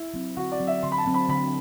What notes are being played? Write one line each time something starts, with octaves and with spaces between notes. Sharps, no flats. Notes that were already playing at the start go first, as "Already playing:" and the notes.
Already playing: E4
F#3 C4
D3 F#4
D5
F#3 C4
E5
D3 C6
B5
A5
F#3 C4
B5
D3 B5